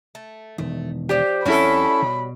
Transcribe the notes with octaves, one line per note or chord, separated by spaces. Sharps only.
A3
E1 D#3 A3
F3 D4 G4 C5
F2 G3 C#4 E4 F#4 A4 C#5 B5
B2